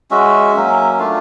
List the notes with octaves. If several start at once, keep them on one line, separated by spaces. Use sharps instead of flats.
G#3 C#4 F#4 E5
F#3 A#3 C#4
A3 D4 F4 F5